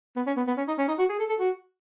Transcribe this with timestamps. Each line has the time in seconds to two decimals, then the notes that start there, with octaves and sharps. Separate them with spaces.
0.16 B3
0.27 C#4
0.37 B3
0.47 B3
0.57 C#4
0.68 D#4
0.78 C#4
0.88 D#4
0.99 F#4
1.09 G#4
1.19 A4
1.29 A4
1.40 F#4